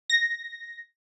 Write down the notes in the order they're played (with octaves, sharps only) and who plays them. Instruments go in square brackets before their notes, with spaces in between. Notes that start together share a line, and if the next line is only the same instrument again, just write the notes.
[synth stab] A#6